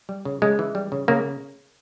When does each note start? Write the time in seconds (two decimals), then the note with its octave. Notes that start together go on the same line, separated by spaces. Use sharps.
0.09 G3
0.25 C#3
0.42 C#3 G#3
0.59 E3
0.75 G3
0.92 C#3
1.08 C#3 A#3